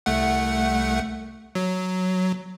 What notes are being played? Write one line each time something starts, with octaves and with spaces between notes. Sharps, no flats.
C2 A3 F#5
F#3